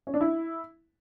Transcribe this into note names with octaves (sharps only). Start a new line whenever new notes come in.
C#4
D4
E4